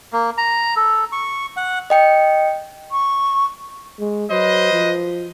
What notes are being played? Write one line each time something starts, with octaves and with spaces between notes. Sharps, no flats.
A#3
A#5
A4
C#6
F#5
D#5 G5 C#7
C#6
G#3
F#3 B4 C5 D#5
F3